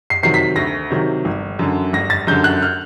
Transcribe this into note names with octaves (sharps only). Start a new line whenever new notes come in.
C7
C3 D#3 F#3 C7
B6
D2 A#6
C3 D#3 F#3
G1
F#2 D3
G1 A#6
A6
F#2 D3 G6
F#6
F6